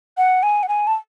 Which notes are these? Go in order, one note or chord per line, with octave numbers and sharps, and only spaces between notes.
F#5
G#5
F#5
G#5
A5